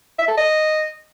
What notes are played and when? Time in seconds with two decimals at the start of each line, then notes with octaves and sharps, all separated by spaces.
0.18 E5
0.28 A4
0.37 D#5